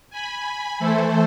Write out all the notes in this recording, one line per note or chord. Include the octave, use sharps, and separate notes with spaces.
G#5 B5
E3 A3 E4 A4 C5